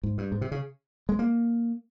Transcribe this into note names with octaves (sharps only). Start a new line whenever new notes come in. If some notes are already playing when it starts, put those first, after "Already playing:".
G#2
G2
G#2
C3
C#3
G#3
A#3